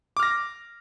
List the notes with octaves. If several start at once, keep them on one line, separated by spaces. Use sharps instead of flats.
D6 F6 A#6